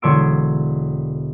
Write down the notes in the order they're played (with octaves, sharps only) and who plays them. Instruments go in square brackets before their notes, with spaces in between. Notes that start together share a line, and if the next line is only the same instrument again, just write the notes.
[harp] E1 D3 C#5 C6 E6 D7